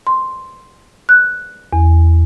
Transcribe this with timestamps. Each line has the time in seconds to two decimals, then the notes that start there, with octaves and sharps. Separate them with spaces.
0.07 C6
1.09 F#6
1.73 E2